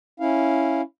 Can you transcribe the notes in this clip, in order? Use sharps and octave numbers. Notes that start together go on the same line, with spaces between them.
C#4 E4 F5